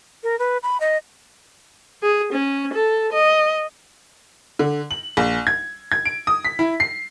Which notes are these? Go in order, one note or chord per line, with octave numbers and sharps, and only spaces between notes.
A#4
B4
B5
D#5
G#4
C#4
A4
D#5
D3
F#7
A#1
G#6
G#6
D7
D#6
B6
E4
C7